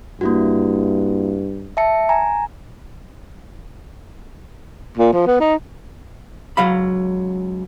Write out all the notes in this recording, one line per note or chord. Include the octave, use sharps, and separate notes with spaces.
G2 A#3 E4 F#4
E5 A5 C#7
G#5 A#5
A#2
F3
B3
D#4
C#2 F#3 F5 B5